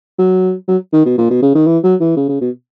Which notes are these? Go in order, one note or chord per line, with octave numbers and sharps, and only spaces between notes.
F#3
F#3
D#3
B2
A#2
B2
C#3
D#3
E3
F#3
E3
C#3
C#3
B2